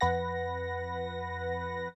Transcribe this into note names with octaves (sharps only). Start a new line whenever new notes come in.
F2 B4 F#5 A#6